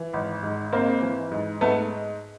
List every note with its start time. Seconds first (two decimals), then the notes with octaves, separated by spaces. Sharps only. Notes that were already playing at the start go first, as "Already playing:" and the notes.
Already playing: E3
0.13 G#1
0.43 G#2
0.73 G#1 A#3 C4
1.02 E3
1.31 G#2
1.61 G#2 A3 B3